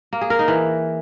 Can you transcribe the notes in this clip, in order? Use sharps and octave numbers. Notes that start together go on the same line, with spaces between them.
A#3
G#4
A#4
D#4
E3